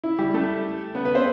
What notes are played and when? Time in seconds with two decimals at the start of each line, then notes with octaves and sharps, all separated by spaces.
0.04 E4
0.18 G3 G4
0.34 A3 A4
0.95 B3 B4
1.05 B3 B4
1.15 C4 C5